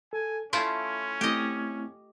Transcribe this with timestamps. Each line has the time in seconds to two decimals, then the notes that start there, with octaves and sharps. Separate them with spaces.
0.13 A4 G#5
0.53 A3 C#4 E4 F4 C6
1.21 A3 C4 E4 G4 D#5